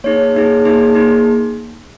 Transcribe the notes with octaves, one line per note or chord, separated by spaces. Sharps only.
A#3 D#4 G#4 C#5
A#3 D#4 G#4
A#3 D#4 G#4
A#3 D#4 G#4